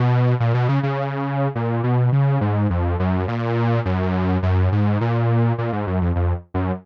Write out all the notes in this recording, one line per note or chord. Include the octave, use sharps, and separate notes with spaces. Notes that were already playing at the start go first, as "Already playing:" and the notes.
Already playing: B2
A#2
B2
C#3
C#3
A#2
B2
C#3
G#2
F2
F#2
A#2
F#2
F#2
G#2
A#2
A#2
G#2
F#2
F2
F2
F#2